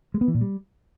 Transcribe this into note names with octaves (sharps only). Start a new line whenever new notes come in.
G#3
B3
E3
A#2
G3